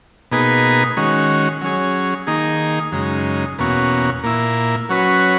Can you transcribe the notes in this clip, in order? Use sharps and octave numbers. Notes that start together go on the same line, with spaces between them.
B2 A#3 D#4 G#4 B4
D#3 G#3 C#4 F#4
F#3 C#4 G#4
D#3 A#3 D#4 G#4
F#2 C#3 G#3 D#4
E2 B2 A#3 C#4 F#4
A#2 A#3 E4
F#3 C#4 F#4 B4